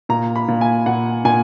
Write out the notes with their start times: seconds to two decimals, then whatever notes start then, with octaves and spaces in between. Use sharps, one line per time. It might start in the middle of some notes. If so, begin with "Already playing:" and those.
0.09 A#2 A#5
0.36 B5
0.48 A#2
0.61 G#5
0.86 A#2 F#5
1.25 A#2 G#5